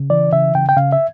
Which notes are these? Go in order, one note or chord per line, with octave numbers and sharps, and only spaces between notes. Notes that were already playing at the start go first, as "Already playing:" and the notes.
Already playing: C#3
E3 D5
C#3 E5
C#3 G5
G5
C#3 F5
E5